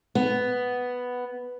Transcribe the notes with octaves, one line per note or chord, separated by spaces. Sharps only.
B3